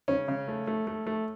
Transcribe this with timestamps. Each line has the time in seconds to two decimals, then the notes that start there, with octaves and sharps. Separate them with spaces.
0.08 C#3 C#4
0.28 C#3
0.48 A3
0.67 A3
0.87 A3
1.06 A3